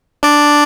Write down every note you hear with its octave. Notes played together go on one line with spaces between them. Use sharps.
D4 D5